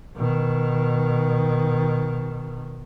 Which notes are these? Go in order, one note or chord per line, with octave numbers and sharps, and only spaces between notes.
B2 D#3